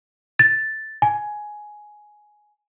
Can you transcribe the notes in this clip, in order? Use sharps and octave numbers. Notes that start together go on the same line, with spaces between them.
A6
G#5